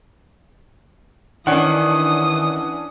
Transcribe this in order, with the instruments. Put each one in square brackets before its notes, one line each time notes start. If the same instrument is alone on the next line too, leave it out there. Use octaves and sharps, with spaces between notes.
[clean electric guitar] D#3 [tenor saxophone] E3 [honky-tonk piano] C#4 D4 F#5 [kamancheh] D#6